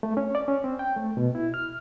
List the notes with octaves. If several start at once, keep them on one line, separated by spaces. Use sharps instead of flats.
A3
C#4
D5
C#4
C4
G5
A3
B2
E4
F6